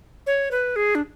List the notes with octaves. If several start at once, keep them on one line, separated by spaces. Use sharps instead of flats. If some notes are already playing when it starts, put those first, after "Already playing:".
C#5
B4
G#4
D4